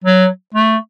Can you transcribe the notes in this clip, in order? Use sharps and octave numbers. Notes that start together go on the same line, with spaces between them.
F#3
A3